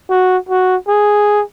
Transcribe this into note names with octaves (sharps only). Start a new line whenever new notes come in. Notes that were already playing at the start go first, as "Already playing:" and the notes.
F#4
F#4
G#4